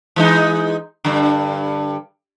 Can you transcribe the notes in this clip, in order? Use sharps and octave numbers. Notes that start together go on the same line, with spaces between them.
E3 G#3 D#4
G2 D3